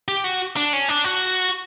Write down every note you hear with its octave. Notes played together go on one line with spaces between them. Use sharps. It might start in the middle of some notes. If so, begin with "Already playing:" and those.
G4
F#4
D4
C#4
D4
F#4